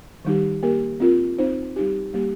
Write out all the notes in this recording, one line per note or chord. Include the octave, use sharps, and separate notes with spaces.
D#3 G3 D#4 G4
A#3 G4 A#4
C4 F4 A#4
C4 D#4 C5
G3 D#4 G4
G3 A#3 G4